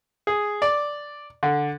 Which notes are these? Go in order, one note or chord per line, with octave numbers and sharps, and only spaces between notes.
G#4
D5
D3